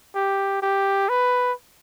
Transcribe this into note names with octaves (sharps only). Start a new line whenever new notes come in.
G4
G4
B4